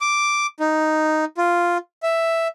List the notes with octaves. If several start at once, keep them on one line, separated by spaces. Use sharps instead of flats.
D6
D#4
F4
E5